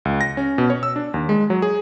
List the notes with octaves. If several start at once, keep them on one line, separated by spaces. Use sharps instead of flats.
C#2
A#6
C#4
B2
C#5
E6
D4
D#2
G#3
F#3
G#4